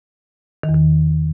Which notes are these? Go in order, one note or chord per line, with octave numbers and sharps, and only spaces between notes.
D#3
E2
D#3